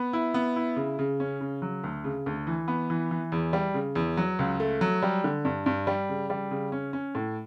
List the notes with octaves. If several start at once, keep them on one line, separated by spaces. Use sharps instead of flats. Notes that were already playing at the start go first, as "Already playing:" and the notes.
Already playing: B3
E4
B3
E4
C#3
C#3
C#4
C#3
F#3
D2
C#3
D2
E3
B3
E3
E3
E2
G3
C#3
E2
F#3
C#2
A3
F#3
G3
D3
G2
G2
G3
C#3
G3
C#3
C#4
C#4
A2